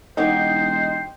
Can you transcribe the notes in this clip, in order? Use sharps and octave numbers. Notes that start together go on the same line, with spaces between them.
E1 D#4 F#4 G4 C5 F#5